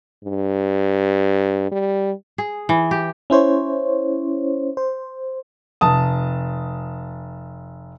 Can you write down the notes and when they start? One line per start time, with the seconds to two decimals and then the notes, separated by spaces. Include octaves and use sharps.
0.24 G2
1.72 G3
2.38 G#4
2.69 E3
2.91 G4
3.30 C#4 E4 C5 C#5
4.77 C5
5.81 F1 A5 D#6